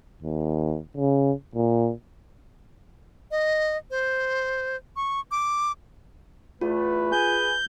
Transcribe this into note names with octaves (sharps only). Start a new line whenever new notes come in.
D#2
C#3
A#2
D#5
C5
C#6
D6
E2 A3 F4 B4
G#4 G#5 G6